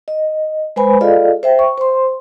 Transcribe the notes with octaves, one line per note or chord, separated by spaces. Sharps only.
D#5
G#3 B4 C5 G#5 B5
F4 G#4 A4 D5 D#5 F5
C5 E5 G5
C#6
C5 C6